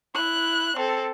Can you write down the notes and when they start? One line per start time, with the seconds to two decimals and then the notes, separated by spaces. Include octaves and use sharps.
0.15 E4 F#6
0.77 C4 A4